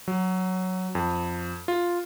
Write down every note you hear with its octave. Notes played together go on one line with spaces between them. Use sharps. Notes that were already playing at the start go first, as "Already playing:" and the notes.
F#3
F2
F4